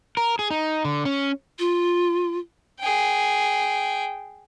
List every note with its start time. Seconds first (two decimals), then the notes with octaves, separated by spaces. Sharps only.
0.17 A#4
0.39 G#4
0.51 D#4
0.85 D3
1.05 C#4
1.59 F4
2.80 G#4 G5